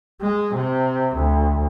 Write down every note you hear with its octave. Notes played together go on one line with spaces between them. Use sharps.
G#3
C3
D2